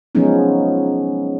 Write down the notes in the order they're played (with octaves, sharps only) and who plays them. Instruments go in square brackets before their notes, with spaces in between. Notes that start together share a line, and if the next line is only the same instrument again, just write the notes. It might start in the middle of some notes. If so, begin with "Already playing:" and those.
[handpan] F3 F#3 G#3 B3 C#4 D#4